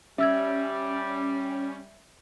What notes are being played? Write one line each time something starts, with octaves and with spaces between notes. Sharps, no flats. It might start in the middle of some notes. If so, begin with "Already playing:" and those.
G3 C#4 E5 E6 G#6